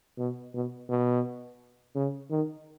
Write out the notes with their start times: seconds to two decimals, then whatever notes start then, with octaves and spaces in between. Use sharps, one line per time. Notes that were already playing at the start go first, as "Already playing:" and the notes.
0.18 B2
0.54 B2
0.89 B2
1.96 C#3
2.31 D#3